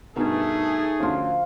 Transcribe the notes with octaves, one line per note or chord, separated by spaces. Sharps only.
G2 B2 A3 D#4 G#4 A#4
D2 F3 C#4 F4